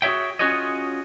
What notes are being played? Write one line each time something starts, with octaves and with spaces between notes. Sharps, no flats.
F#4 G#4 C#5 E5 G5
C#4 F4 F#4 G#4 C#5 D#5